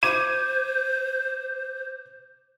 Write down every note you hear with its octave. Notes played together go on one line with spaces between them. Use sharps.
C5 D6 G#6 D#7